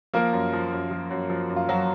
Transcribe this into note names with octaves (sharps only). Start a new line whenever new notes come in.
F3 A#3 A#4
F#2
F3
F#2
F3
F#2
F3
F#2
F4
F3 F#3 F#4